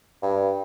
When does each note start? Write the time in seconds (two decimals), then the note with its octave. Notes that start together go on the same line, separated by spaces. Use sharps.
0.23 G2